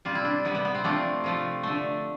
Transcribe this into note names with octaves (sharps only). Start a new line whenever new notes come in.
C3 G3 F4
E4
D4
C3 G3 B3
B3
B3
C4
C3 F3 A3 D4
C3 F3 A3
D3 A3